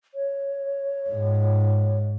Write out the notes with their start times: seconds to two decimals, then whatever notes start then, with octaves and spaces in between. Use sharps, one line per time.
0.14 C#5
1.09 G#2